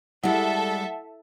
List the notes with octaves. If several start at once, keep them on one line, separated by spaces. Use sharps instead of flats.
G3 G#3 E4 A4 E5 F#5